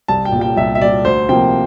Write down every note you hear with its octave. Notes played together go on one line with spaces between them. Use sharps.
C2 A5
G5
A#2
G3 G5
C2 E5
E5
A#2 G3 D5
D2 C5
C3 F3 A#3 G5